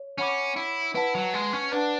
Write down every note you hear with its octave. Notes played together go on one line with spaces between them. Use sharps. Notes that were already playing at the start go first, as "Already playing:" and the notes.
Already playing: C#5
C#4 C#5 F#5 B5 D6
E4
E4 B4 F#5 A5
F#3
G#3
C#4
D4 B4 F#5 A5